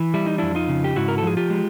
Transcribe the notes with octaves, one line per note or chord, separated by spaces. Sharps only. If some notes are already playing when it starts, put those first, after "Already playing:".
Already playing: E3
G3 E4
D#4
F2 D4 E4
D#4 F4
C#3
G4
G#2 E4 F#4
A#4
A4
F3 G#4
F4 G4
G#3